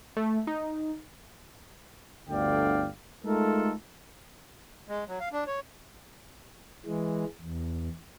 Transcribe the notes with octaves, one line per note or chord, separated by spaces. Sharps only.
A3
D#4
G1 D2 D3 D5 F5 G5
G#3 A3 D#4 F4 A4 A#4
G#3
F#3
F5
D4
C#5
E3 G#3
E2